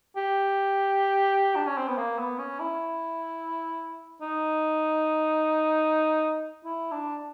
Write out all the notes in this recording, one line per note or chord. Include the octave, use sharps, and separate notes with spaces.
G4
D4
C#4
C4
B3
A#3
B3
C#4
E4
D#4
E4
D4